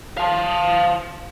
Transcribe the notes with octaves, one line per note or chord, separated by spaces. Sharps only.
F5 A5